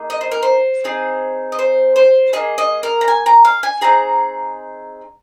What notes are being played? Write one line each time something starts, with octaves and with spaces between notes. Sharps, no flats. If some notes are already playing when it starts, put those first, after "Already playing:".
Already playing: A#3 D#4 G#4
D#5
C5
A#4
C5
C4 D#4 G#4
D#5
C5
C5
A#3 D#4 G#4 D#5
D#5
A#4
A#5
G#5
A#5
F5
G#5
C4 D#4 G#4 A#5